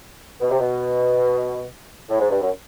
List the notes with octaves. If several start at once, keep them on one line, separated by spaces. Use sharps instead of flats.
B2
C3
B2
A2
G#2
G2
F#2